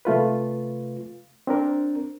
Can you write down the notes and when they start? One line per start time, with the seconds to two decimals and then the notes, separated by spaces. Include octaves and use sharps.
0.05 C3 A3 F4 B4
1.47 C4 D4 A#4